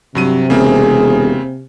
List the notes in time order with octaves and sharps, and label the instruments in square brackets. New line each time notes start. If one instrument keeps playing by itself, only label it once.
[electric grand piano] G2 F#3 D#7 [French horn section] C3
[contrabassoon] E1 [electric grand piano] C#3 A#3 C4 [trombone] G#4